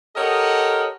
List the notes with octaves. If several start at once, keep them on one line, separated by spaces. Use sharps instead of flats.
G4 A4 A#4 C#5 D#5 F#5